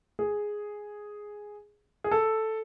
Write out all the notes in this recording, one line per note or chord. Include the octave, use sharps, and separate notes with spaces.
G#4
G#4
A4